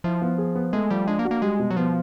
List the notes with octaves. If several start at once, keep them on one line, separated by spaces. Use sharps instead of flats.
F3 E4
B3
G#4
B3
G#3 A3
F3 G3
G#3 D4
A#3
F#4
A#3
G3 G#3
B2
F#3
F3 B3